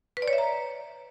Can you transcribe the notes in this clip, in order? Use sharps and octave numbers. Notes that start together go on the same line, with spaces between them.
B4
D5
C#5
E5
A#5